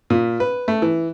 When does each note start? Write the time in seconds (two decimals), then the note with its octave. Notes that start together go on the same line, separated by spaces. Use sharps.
0.10 A#2
0.40 B4
0.68 A3
0.82 E3